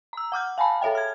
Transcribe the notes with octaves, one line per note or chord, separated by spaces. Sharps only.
A#5 E6
F#5 D6 F6 G6
F5 G#5 A5 B5
G#4 A4 C#5 E5 G5
F6 G#6